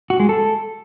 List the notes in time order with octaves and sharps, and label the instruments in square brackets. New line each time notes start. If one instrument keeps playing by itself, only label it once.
[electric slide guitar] F#4
G#3
A4